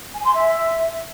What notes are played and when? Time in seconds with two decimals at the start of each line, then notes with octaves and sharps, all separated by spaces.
0.15 G#5
0.25 C6
0.35 E5